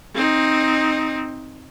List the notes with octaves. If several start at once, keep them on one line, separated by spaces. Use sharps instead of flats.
C4 D#4